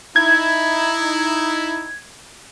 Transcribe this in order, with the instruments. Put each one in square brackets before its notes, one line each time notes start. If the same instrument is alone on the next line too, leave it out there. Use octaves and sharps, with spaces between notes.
[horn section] D#4 E4 [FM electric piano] G#6